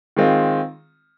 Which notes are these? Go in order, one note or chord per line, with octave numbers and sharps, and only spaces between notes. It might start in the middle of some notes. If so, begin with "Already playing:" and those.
D#3 G#3 C4 F4